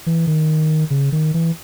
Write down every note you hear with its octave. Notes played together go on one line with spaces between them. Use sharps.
E3
D#3
C#3
D#3
E3